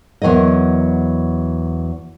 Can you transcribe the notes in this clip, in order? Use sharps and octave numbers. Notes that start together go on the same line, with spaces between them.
E2 B2 F#3 A#4 D#5